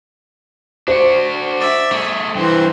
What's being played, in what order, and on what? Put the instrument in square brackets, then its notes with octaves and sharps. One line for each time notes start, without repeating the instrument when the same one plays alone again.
[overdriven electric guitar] D4 F#4 [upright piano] C5
[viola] D5 E5
[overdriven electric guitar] A3 G#4
[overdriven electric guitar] G2 C4 [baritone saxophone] E3 [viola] C5